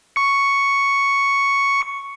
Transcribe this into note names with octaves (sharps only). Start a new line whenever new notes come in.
C#6 C#7